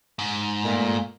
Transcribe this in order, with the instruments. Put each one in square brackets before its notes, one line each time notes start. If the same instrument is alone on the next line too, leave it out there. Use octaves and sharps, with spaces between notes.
[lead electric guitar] G#2
[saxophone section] A#2 A3